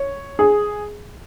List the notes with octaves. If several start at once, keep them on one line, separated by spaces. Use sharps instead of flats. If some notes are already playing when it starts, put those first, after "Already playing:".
Already playing: C#5
G#4